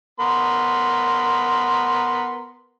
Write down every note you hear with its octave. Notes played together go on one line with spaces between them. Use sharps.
B3 A#4 C6